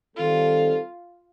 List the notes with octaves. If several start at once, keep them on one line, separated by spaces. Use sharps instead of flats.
D#3 G3 C4 D#4 F4 A4